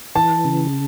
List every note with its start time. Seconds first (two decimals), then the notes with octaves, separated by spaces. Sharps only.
0.15 E3 A5
0.45 C#3